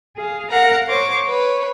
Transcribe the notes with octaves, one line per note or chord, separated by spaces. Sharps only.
G#4 F5
A#4 F5 F#5 A#5
C5 C#5 C#6 D6
B4 C#5